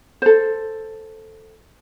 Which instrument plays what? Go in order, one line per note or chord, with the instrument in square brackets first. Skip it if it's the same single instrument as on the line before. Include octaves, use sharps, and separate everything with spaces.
[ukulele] A4 C5